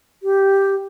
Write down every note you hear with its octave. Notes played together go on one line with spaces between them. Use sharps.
G4